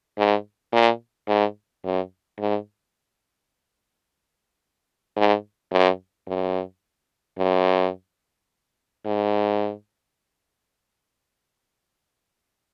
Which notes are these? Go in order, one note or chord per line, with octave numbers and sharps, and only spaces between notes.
G#2
A#2
G#2
F#2
G#2
G#2
F#2
F#2
F#2
G#2